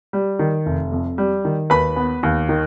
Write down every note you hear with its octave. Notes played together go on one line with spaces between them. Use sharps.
G3
D#3
F1
F2
G3
D#3
D#2 B4 B5
B3
D#2
D#3